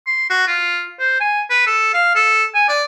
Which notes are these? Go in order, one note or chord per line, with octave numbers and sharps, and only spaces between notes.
C6
F#4
F4
C5
G#5
B4
A4
F5
A4
G#5
D5